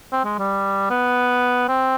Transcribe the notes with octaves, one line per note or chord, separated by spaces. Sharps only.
C4
G#3
G3
B3
C4